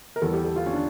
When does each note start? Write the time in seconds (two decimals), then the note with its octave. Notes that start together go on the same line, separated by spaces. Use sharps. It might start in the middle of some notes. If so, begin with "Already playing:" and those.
0.16 A#4
0.21 E2 E3 G3 A4
0.33 G4
0.44 A4
0.56 F4
0.66 C#4
0.73 D4